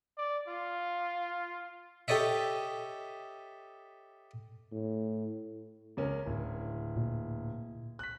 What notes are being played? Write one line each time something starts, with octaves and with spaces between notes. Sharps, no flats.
D5
F4
G4 A4 C#5 D#5 E5
A2
C#2 C#4 A#4
D1
A#2
F#6 B6